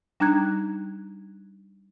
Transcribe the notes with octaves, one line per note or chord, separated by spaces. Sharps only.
G3 D4 D#4 A#5 F#6 G#6